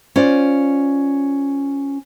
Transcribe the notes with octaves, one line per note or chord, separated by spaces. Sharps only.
C#4 F4 C5 D5